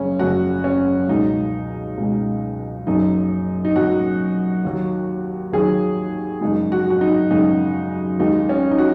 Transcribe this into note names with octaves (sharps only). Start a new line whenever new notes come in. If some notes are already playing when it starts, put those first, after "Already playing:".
Already playing: F#1 F#2 C#3 C#4
F#1 F#2 C#3 F#4
C#4
C#2 B2 G#3 D#4
C#2 B2 G#3
F#1 F#2 F#3 D#4
D#4
F#1 F#2 F#3 F#4
D#2 D#3 F#3
D#2 D#3 F#3 G#4
F#2 C#3 G#3 D#4
F#4
F#4
D#4
F#2 C#3 G#3 D#4
D#2 D#3 G#3 D#4
C#4
D#4
F#4